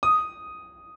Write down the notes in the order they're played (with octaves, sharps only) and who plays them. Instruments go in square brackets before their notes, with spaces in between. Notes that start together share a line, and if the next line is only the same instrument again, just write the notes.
[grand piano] D#6